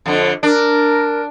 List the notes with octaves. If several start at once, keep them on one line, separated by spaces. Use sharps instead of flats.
F2 D3
D4 A#4